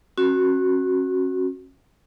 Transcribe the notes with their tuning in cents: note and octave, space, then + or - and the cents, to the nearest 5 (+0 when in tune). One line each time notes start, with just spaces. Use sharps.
C#4 -35 F#4 +0